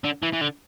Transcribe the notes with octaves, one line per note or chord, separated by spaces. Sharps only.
D3
E3
E3
D3